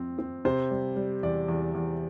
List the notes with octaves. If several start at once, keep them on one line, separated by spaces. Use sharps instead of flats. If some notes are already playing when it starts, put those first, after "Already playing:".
Already playing: F2 C4
C4
C3 C5
G3
G3
E2 D5
E2
E2